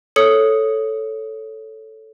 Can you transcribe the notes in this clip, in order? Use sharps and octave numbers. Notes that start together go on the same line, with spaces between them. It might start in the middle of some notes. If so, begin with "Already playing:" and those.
A4 C#5 D#6 C#7